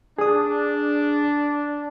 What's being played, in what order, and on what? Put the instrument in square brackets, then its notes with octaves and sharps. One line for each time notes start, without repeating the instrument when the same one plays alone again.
[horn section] D4 [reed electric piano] G#4 D#6